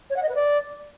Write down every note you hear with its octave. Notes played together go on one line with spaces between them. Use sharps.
C#5
F#5
D#5
B4
D5